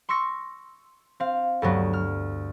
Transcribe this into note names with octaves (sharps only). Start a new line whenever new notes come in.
C6 C#6 E6 A#6 C#7
C4 F5
D2 G2 F#3 B3
F6